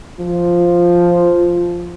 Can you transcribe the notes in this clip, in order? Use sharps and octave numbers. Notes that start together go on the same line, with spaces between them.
F3